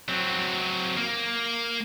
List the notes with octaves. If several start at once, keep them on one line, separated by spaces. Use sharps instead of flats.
F#3 C4
A#3